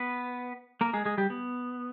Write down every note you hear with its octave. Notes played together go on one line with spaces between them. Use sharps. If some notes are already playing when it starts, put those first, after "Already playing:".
Already playing: B3 B4
A#3 A#4
G#3 G#4
G#3 G#4
G3 G4
B3